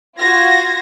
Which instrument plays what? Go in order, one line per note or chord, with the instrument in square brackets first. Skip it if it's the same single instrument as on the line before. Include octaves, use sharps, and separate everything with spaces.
[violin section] F4 F#4 G#6 A#6